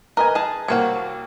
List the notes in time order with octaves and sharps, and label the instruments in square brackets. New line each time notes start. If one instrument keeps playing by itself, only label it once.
[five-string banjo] A#4 [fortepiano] B4 D#5 G#5
[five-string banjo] G#4 A5
[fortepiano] C2 A#3 [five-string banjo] F#4 C5 C#5